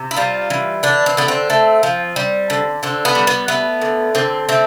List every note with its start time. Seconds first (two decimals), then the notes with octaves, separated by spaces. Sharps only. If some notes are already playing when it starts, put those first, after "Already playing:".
Already playing: C3
0.11 E4
0.16 G3 F4
0.50 E3
0.83 D3 D4
1.06 C4
1.17 D3 B3
1.28 C4
1.50 A3
1.83 F3
2.16 G3
2.50 D3
2.83 D3 C4
3.05 B3
3.15 G3
3.27 B3
3.48 A3 B3
3.82 D3
4.15 D3 C4
4.49 A3 C4